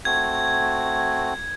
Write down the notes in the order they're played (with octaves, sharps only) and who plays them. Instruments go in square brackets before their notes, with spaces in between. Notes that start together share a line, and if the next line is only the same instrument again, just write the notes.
[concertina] A3 C4 F#4 [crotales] G#6